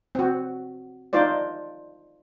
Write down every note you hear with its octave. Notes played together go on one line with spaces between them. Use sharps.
C4 F#4
D4 D#4 F4 C5 D5